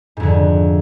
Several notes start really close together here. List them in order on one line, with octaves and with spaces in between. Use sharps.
G#2 F2 D3